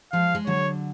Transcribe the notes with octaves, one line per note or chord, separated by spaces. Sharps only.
F3 G#3 F5
G#3
D3 F#3 C#5